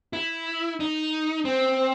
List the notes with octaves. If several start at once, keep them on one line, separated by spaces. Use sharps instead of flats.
E4
D#4
C4